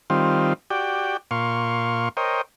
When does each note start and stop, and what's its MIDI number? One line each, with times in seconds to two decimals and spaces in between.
0.10 0.53 51
0.10 0.53 55
0.10 0.53 60
0.10 0.53 65
0.70 1.17 66
0.70 1.17 67
0.70 1.17 74
0.70 1.17 79
1.31 2.09 46
1.31 2.09 77
1.31 2.09 84
1.31 2.09 85
2.17 2.42 70
2.17 2.42 72
2.17 2.42 73
2.17 2.42 75
2.17 2.42 79